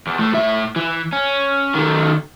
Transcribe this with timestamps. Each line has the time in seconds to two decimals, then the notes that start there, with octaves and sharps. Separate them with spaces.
0.07 E2
0.19 A2 A3
0.34 A2 E5
0.76 E3
1.13 C#4
1.75 D#3 A3